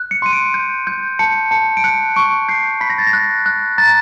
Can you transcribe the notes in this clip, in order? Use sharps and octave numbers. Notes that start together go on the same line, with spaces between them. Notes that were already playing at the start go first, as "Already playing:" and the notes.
Already playing: F#6
C#7
C6 D#7
D7
G6
G6
A5 C#7
A5 C#7
D7
F#6 C#7
C#6 D7
G6 C7
B5 B6
A#6
A6
A#6
F#6
F#6
A#5 A6